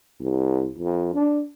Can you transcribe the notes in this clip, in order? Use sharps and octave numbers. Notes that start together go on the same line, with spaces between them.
C2
F2
D4